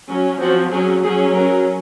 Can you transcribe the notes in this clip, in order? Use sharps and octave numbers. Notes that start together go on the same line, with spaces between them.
F#3 C#4
F3 C4 F#4
F#3 C#4 G#4
F#3 C#4 G#4
F#3 C#4 A#4